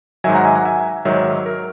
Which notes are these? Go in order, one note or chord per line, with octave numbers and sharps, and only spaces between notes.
G#2 D#3 F#3 E5 G#5
F#5 A#5
E5 G#5
F#5 A#5
E5 G#5
G#2 D#3 F#3 C#5 E5
A#4